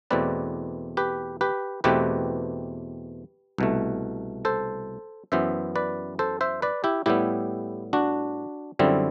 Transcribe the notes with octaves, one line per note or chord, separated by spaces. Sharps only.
E2 B2 A3 C4 B4 D5
G4 B4
G4 B4
E2 B2 A3 C4 G4 B4
C2 B2 A3
A4 C5
F#2 E3 B3 C5 E5
B4 D5
A4 C5
C5 E5
B4 D5
E4 G4
A2 G3 B3 E4 G4
D4 F#4
F#2 D3 G3 C4 E4